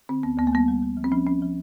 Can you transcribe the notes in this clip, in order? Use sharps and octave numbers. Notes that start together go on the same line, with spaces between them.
D3 C4
D2 B3
D2 B3
A#3
G3 B3
G3
G3
F3
C4
F3 C#4
F3 C#4
F3